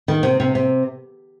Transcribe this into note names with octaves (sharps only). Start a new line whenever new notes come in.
D#3
C3
C3
C3